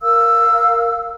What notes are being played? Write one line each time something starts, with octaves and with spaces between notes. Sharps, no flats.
A#4 F5 E6